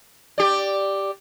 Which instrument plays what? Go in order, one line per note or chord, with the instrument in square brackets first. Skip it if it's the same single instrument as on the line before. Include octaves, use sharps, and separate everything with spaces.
[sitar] G4 D5